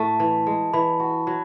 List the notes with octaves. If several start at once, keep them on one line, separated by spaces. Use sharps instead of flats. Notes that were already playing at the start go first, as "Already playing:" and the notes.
Already playing: A2 A3 A5
E3
G#3
E3 B5
F#4
F#3